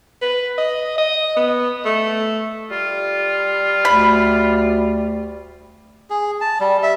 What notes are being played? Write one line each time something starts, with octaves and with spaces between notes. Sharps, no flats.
B4
D#5
D#5
B3
A3
G3 F4
D2 B5
G#4
A5
G3
E5